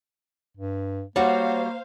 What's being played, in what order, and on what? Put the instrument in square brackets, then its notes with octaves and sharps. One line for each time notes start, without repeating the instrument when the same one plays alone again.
[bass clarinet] G2
[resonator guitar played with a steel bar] G3 F#4 [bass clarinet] A#3 [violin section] C5 F5 [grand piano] C#5 F#5